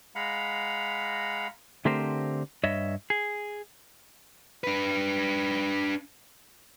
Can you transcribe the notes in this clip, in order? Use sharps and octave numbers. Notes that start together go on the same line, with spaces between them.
G#3 F5 F#5 A#5 B5
D3 A3 C4 G4 A#4 C5
G2 C#5 D#5 E5
G#4
D4 B4